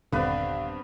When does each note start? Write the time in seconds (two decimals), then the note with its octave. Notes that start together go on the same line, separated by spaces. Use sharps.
0.12 D#1 G2 D3 B3 C4 B4 D5 F5